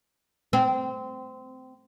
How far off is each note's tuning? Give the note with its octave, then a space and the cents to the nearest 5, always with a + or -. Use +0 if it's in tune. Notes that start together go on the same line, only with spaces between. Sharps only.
C4 -20